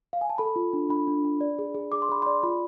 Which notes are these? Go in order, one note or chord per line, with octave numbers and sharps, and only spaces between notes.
F5
G#5
A5
A4 B5
F4
D4
D4 B5
D4
D4
D5
G#4
G#4
G#4 D6
C6
G#4 B5
D5 C6
F4 B5